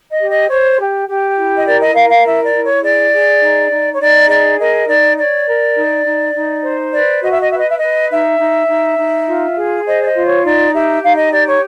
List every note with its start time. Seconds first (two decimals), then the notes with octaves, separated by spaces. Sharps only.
0.09 D#5
0.19 G4
0.29 D#5
0.48 C5 C#5
0.77 G4
1.07 G4
1.36 E4
1.54 D#5
1.65 A#4 D5
1.80 D#5
1.94 A#4 F5
2.09 F5
2.23 E4 E5
2.43 D5
2.53 E4
2.63 C#5
2.82 G#4 D5
3.12 G#4
3.41 D#4
3.70 D#4
3.92 C#5
3.99 D#4 D5
4.28 G#4 D5
4.57 A#4 D#5
4.87 D#4 D5
5.16 C#5 D5
5.46 A#4
5.76 D#4
6.04 D#4
6.34 D#4
6.62 C5
6.92 B4 D5
7.21 F#4 D#5
7.31 E5
7.40 D#5
7.49 B4 E5
7.59 D#5
7.68 E5
7.77 B4 D#5
8.09 D#4 E5
8.38 D#4
8.68 D#4
8.97 D#4
9.26 F4
9.56 G#4
9.85 C5 D#5
10.00 D5
10.05 D#5
10.14 F4
10.24 C#5
10.43 D#4 D5
10.72 G4 E5
11.02 D#4 F5
11.17 D#5
11.31 G4 D5
11.46 C#5